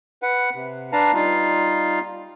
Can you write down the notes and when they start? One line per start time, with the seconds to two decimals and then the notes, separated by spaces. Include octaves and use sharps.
0.22 B4 F#5
0.55 C3
0.92 D4 B4 F5 A5 A#5
1.14 G3 D#4 F4 F5